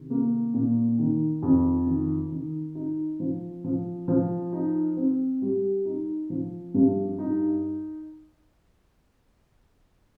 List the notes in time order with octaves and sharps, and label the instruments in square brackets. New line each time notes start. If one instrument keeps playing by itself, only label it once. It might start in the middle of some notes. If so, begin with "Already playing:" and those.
Already playing: [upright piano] C3 D#3
A#3
A#2
D#3
F2
D#3
D#3
D#4
F3
F3
F3
D#4
C4
G3
D#4
F3
G2
D#4